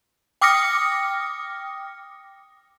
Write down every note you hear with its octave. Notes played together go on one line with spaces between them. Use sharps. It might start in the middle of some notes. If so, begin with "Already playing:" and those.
G5 D6 D#6 F6 A#6 C#7